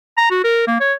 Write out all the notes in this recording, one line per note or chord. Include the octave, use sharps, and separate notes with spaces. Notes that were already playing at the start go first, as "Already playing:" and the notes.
A#5
F#4
A#4
A#3
C#5